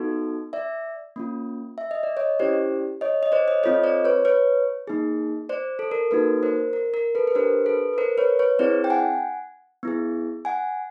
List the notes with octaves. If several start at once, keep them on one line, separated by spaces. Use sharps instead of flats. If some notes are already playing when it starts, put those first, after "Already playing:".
Already playing: B3 D#4 F#4 A4
D5 E5
A#3 C#4 F4
E5
D#5
D5
C#5 D#5
C#4 E4 G4 C5 D5
C#5 D#5
D#5
C5 D5
C#5 D#5
C4 F4 A4 C#5 D#5
C5 D5
B4 C#5
B4 C#5
A#3 D#4 G#4
C5 D5
A4
A#4
A#3 D#4 F#4 A4 B4
A#4 C5
A#4
A#4
A4 B4
B4
D4 G4 A#4 C5
A4 B4
B4
A#4 C5
B4 C#5
B4 C#5
C4 E4 G#4 C5 D5
G5
F#5 G#5
B3 E4 G#4
F#5 G#5